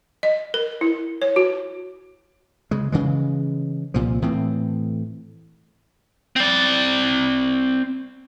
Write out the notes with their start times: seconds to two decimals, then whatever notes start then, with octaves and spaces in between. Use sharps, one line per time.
0.23 D#5
0.54 A#4
0.81 E4
1.22 C#5
1.36 F#4
2.71 C#3 G#3
2.92 C#3 E3 G#3
3.94 C2 A#2 F3
4.22 A2 E3 C4
6.36 C4 D5